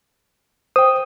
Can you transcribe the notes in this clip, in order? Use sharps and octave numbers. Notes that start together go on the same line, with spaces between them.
C5 G5 D#6